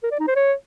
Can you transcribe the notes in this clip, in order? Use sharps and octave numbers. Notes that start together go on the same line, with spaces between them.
A#4
D5
D#4
C5
C#5